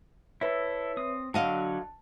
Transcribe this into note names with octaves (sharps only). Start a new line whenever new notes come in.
E4 A4 B4 C#5 E5
C4 D#6
D3 F#3 F#4 D#5 F5 A5